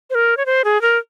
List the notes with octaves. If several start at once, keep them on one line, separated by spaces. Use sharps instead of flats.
C5
A#4
C#5
C5
G#4
A#4